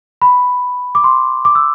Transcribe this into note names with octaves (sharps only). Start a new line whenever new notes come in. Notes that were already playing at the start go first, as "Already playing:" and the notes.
B5
D6
C6
D6
E6